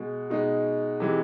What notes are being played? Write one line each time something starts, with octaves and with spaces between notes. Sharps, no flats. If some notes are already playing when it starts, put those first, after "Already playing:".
Already playing: B2 G#3
B2 G#3 D#4
C3 E3 G#3